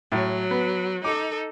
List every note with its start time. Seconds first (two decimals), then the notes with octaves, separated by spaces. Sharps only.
0.12 A2 F#3
0.51 B3
1.04 D#4 A4 D6